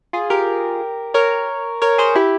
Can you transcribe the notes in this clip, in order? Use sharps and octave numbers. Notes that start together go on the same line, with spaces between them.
F4 G#4
G4 A#4
A#4 C#5
A#4 C#5
G#4 C5
E4 G4